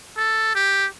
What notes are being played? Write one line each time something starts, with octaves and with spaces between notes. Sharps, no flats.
A4
G4